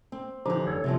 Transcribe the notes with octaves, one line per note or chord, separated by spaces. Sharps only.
C4
D3 E3 F3 D#4 G4
F1 A4 C#5
E2 G2 C3 F3